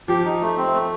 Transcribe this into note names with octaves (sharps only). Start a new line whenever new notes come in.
F3 G4
D#4
A3
C4
A3